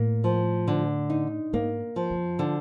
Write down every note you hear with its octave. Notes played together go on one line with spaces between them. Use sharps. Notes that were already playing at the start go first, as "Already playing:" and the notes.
Already playing: A2 A#3
F3
D3
D#4
G#2 A#3
F3
F2
D3